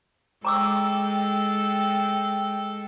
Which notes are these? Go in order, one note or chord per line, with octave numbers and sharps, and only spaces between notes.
G#3 A4 G5 A#5 D6 E6